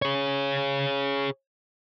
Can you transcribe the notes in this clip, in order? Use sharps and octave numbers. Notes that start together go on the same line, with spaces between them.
G#4 C#5